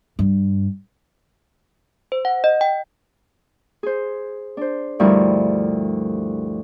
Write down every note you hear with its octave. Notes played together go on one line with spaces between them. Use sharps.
G2
C5
F#5
D#5
G5
G#4 C5
D4 C5
D2 G2 F3 G3 E4 A#4